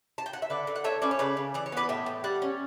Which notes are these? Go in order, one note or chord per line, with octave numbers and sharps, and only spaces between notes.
A5
G5
F#5
E5
D3 B4 D5
D3
F#5
A3 C#5 E5
C#4 B4 D5
C#5
C#3 B4 D5
C#3
E3 D5
C#5
B3 B4 D5
A2 E5 G5
A2
G3 D5 F#5
C#4